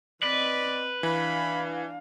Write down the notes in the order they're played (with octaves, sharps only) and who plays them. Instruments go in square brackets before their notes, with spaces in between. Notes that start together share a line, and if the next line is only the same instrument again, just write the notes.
[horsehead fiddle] C4 D#5 [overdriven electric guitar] B4 [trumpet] D5
[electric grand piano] E3 [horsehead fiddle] D4 F5 [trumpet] B5